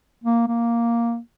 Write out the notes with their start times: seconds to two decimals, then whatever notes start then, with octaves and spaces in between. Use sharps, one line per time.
0.23 A#3
0.47 A#3